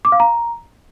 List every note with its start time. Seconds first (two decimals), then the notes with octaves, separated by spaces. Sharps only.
0.05 D6
0.12 F5
0.20 A#5